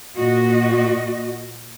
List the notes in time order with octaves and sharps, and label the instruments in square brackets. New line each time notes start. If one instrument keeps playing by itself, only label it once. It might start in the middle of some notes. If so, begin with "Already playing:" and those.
[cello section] A#2 F#4 D#5